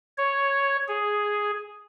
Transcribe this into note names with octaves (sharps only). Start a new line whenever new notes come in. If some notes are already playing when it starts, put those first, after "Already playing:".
C#5
G#4